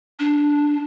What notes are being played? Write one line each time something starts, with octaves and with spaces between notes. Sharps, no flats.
D4